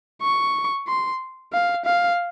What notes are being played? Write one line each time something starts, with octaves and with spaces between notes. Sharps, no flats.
C#6
C6
F5
F5